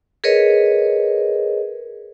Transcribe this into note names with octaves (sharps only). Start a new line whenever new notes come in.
G#4 A#4 B4 C#5 D#5